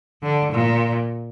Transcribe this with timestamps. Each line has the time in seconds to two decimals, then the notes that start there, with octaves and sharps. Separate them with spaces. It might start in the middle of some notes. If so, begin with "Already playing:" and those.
0.23 D3
0.51 A#2